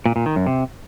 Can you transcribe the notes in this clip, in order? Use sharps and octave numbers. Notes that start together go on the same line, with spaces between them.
A#2
A#2
D#3
F#2
C3